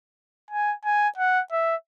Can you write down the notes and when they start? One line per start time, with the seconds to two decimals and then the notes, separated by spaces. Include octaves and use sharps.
0.51 G#5
0.85 G#5
1.18 F#5
1.52 E5